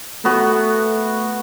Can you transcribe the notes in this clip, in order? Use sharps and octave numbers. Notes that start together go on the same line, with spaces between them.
A3 B3 F#4